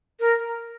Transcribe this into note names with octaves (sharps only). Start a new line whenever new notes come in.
A#4